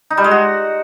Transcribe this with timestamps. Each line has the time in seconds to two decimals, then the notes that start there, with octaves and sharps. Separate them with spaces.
0.10 D#4
0.17 G3
0.24 G#3
0.31 F#4